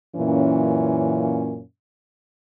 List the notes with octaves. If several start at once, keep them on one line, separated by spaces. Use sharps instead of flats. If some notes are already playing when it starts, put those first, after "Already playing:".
F#2 A#2 E3 A#3 C#4